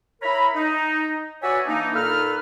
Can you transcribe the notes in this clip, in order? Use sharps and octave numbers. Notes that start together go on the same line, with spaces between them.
E4 A#4 C#5 A#5 B5
D#4
F#4 B4 C#5 D5 E5 G#5
E3 A#3 D4 D#4
A#2 D#4 A4 B4 F6